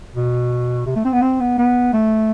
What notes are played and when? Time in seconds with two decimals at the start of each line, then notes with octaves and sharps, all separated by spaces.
0.15 B2
0.86 C3
0.96 A3
1.05 C4
1.12 B3
1.22 C4
1.40 B3
1.58 B3
1.93 A3